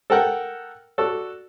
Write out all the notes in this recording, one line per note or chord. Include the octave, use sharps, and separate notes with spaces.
A4 A#4 F#5 G5
F#4 A4 D5